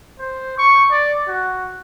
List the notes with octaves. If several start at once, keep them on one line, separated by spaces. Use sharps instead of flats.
C5
C#6
D5
F#4